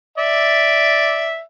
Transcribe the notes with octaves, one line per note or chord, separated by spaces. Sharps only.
D5 E5